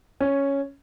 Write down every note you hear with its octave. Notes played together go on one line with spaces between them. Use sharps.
C#4